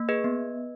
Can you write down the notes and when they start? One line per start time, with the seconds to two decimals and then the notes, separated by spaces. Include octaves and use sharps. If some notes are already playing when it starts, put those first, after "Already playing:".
Already playing: A#3
0.09 G#4 B4 D#5
0.24 B3